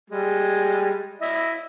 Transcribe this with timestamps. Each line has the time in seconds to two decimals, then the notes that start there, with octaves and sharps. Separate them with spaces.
0.10 G3 G#3
1.22 E4 D#5 E5